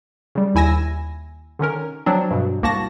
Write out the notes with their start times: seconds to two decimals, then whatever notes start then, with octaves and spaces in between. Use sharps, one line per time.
0.35 C#3 G3
0.55 D#2 E4 G#5 E6 A#6
1.59 D3 D#3 C#4 A#4
2.06 F3 F#3 C4 D4
2.31 G2 B2
2.63 C2 A#3 F#4 A5 A#6